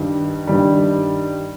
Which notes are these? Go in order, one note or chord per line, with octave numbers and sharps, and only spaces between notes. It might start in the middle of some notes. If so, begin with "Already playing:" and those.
Already playing: G2 D#3 G3
G2 D#3 G3